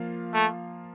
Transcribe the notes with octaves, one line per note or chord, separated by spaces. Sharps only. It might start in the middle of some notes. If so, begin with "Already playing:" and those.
Already playing: F3 A#3 F4 F5
A3